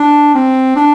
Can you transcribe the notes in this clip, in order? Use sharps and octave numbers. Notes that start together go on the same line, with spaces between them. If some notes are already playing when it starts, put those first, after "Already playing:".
Already playing: D4
C4
D4